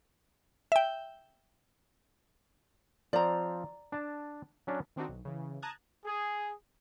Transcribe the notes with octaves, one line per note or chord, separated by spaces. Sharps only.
E5 G5
F3 C4 D5 A#5
D4 A5
F#3 C#4 D4
D#3 C4 D4 D#4 F#4
B1
C#3 E3
A5 A#5 D#6 F#6 G#6
G#4